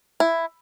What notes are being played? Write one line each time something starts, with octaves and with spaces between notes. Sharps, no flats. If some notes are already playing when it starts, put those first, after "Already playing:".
E4